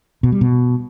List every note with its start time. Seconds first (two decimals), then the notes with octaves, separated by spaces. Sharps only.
0.23 B2
0.32 G3
0.41 B2